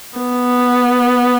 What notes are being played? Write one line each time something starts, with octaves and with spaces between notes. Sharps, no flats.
B3